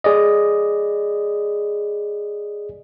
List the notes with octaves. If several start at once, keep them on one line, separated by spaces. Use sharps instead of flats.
G#4 D5 D#5